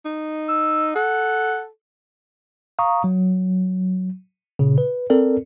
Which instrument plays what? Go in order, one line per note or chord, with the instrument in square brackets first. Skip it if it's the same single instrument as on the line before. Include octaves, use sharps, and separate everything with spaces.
[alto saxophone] D#4
[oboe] E6
[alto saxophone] A4 [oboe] F#5
[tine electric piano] F5 A#5 C#6 D#6
F#3
A#2 C#3
B4
C4 A4 A#4 D5